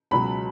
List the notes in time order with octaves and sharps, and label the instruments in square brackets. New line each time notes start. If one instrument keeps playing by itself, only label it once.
[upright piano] C#2 B2 F#3 B5